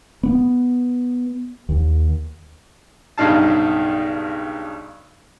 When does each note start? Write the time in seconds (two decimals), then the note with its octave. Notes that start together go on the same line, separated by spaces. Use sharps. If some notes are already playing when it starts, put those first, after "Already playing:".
0.23 B3
1.69 D#2
3.18 B1 G2 C#3 D#4 F5 A5